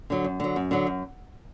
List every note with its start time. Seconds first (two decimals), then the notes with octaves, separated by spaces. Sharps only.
0.10 D3 F#3
0.24 F#2
0.40 D3 F#3
0.56 F#2
0.71 D3 F#3
0.87 F#2